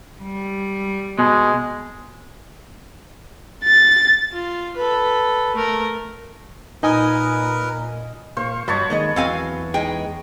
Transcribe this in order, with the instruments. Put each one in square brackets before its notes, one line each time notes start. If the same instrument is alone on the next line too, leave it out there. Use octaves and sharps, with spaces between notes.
[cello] G3
[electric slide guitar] B2 [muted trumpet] G#3
[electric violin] A6
[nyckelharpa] F4
A4 B4
A3 A#4
[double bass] A#2 [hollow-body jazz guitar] D#4 [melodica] A#4 B4 [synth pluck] D#5 G#5 D#6
[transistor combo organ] A#2 F5 C#6 [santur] C5
[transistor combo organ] G2 D#5 [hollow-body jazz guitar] F#3 [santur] C#5 A5 B5
[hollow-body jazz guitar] F2 G#3 D#5 [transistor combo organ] D#3 A#3
[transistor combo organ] E2 B3 [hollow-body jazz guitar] F#3 [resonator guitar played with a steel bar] C4 F5 G#5
[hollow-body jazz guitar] G#3 D#4 G#4 [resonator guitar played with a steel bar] G5